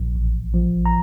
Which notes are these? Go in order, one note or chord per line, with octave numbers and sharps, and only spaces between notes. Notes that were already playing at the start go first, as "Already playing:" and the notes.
Already playing: A#1
A1
F3
A#5